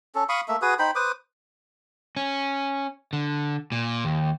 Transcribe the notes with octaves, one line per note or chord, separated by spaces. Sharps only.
C#4 A4
F5 B5 C#6 D#6
A3 A#3 E5
F#4 G#4 B4 D#6
D#4 C5 G5 B5
B4 C5 D6 D#6
C#4
D3
A#2
D#2